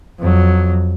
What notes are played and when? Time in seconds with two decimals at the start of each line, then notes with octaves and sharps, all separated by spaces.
0.19 F2 F#3